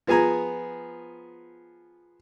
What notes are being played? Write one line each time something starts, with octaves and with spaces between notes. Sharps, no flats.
F3 B3 G#4 G#5 A#5